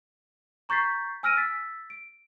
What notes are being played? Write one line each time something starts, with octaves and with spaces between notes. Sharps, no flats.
A#5 C#6 G6 A6 B6 C7
G#5 E6 F6 A#6 D7 D#7
E6 A6 B6
D7